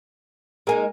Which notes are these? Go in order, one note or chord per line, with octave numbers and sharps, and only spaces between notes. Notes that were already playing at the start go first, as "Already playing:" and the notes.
G#3 A#3 D#4 A#4 G#5